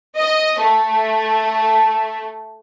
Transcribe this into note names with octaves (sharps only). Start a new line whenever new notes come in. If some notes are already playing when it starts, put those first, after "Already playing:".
D#5
A3